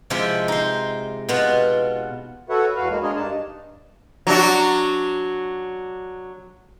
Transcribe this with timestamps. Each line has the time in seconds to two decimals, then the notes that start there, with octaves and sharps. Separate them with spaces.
0.10 C3 F3 G#3 E4 F4 G4
0.48 D#4 C5
1.29 B2 B3 F4
2.50 F#4 A4 B4 C#5 E5 F#5
2.76 E2 F#4 B4 F5
2.90 G#3 A#3
3.03 G#3 D4 G#4 A#4 C#5 D#5
3.16 G2 D4 D#4 A5
4.27 F#3 D4 F#4